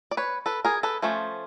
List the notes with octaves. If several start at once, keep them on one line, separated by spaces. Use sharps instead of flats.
D5
B4 C#5
A4 B4
G#4 A#4
A4 B4
F3 A3 C#4 C5